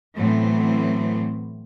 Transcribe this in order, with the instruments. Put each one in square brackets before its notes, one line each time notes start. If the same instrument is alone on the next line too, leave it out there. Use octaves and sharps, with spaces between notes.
[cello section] A2 E3 F#3 B3 C4